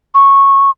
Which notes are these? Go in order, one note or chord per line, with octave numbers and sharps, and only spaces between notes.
C#6